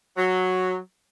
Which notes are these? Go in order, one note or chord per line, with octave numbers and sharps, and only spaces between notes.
F#3